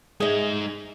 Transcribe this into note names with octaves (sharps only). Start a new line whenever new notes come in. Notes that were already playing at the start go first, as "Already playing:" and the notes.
G#3 D#4 G#4 E5